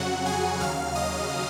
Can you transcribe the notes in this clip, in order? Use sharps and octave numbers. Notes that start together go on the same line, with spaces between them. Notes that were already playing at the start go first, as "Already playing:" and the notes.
Already playing: F2 C#3 F#3 F#4 F#5
G#4 G#5
D#2 C#3 F#3 F5 F6
D#5 D#6